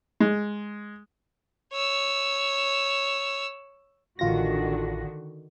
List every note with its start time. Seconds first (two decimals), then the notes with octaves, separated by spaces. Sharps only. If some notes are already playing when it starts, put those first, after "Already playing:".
0.20 G#3
1.73 C#5 E6
4.19 A1 D3 D#3 F4 F#4 A#6